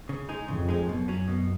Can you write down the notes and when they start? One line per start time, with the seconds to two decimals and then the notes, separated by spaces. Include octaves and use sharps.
0.09 C#3
0.29 G#3 D#4 G#4
0.48 F2 C#3
0.68 G#3 D#4 G#4
0.89 F#2 B2
1.08 F#3 C#4
1.28 B2